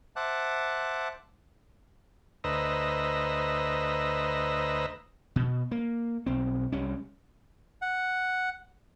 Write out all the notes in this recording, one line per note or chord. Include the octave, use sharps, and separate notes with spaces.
C5 E5 F#5 A5 D6 F#6
D2 B4 C5 D#5 A#5 E6
B2
A#3
B1 C4
C2 G3 C#4
F#5